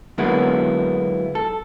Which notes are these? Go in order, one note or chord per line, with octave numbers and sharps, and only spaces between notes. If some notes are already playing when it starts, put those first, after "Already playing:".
D3 F#3 G#3 A#3 B3 E4
A4